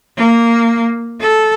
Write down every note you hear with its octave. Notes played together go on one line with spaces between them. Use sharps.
A#3
A4